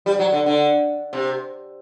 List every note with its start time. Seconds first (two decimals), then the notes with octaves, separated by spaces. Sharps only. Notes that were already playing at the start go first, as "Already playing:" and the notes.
0.06 G3
0.19 F#3
0.32 D3
0.46 D3
1.13 C3